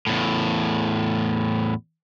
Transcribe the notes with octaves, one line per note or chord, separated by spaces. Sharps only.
E2 A2